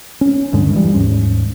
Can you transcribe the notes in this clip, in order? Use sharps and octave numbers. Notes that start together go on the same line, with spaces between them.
C#4
D2 G2 D3 G#3
E3 F3 G3
D#2 G#2 C#4